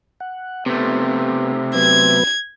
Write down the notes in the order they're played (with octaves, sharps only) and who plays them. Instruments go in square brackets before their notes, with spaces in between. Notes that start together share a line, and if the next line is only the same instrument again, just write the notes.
[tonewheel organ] F#5
[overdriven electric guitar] C3 A3 [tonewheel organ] B3
[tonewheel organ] F#3 B3 B4 [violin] G#6